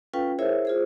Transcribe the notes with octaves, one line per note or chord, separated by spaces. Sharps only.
C#4 F4 A4 B4 F5 G5
E4 G#4 A#4 C5 C#5 E5
F4 G#4 C5